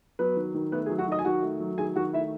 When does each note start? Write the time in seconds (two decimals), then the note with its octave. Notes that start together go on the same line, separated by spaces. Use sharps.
0.19 F#3 B3 B4
0.36 D#3
0.54 D#3
0.72 A3 B3 B4
0.86 G#4
0.90 F#3
0.99 F#4 F#5
1.07 D#3 D#5 D#6
1.19 G#5
1.25 D#3 F#4 F#5
1.43 A3
1.60 F#3
1.78 D#3 G#4 G#5
1.96 D#3 F#4 F#5
2.13 A3 E4 E5